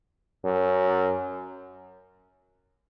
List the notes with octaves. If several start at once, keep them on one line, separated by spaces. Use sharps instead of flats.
F#2